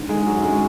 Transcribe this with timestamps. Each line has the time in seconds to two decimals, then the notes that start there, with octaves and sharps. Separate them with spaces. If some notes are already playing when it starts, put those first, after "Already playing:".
Already playing: G#2 D3
0.09 G#3
0.14 D3
0.27 F#3
0.38 F#2
0.45 G#3